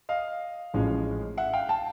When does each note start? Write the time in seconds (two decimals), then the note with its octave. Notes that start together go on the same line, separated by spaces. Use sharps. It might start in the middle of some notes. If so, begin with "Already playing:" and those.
0.09 D#5 F5
0.74 A1 A2 F3 G#3 C#4
1.37 E5 F#5
1.53 F5 G5
1.69 G5 A5